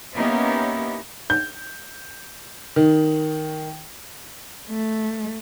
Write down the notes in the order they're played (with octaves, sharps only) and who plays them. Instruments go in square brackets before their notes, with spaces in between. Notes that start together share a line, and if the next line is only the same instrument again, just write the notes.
[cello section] A#3 B3 C#4 D#4 E4 G4
[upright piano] G6
D#3
[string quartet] A3